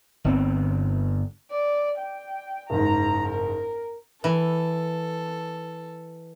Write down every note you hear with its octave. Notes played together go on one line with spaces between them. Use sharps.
G1 B3 C4
D5
G5
F#1 G#2 A#5
A#4
E3 A4